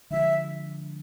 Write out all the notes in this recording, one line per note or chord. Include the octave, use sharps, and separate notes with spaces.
D3 F3 G#3 E5